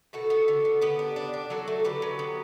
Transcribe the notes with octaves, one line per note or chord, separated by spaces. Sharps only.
B2 F#4 A4
B3
D3
B3
B3 G4 B4
D4
D4
D4
F#3 F#4 A4
A3
D3 G4 B4
F#3
B3